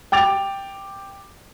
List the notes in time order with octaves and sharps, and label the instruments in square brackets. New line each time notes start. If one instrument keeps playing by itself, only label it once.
[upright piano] G5 D6 A6 F7